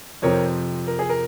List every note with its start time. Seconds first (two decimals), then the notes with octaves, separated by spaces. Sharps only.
0.22 F2 C3 F3 C4 A#4 C#5
0.87 A#4
0.99 G#4
1.09 A#4